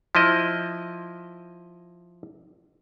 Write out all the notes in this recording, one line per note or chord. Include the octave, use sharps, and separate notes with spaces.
F3 E4 D#5